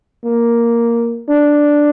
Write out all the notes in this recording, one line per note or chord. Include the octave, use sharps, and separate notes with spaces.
A#3
D4